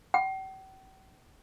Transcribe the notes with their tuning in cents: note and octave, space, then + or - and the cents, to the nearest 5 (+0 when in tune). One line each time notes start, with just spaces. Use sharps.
G5 -45